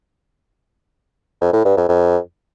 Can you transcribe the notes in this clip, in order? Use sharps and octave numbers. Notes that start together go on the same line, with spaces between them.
F2
A2
G2
F2
F2